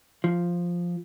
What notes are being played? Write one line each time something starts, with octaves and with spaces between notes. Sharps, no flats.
F3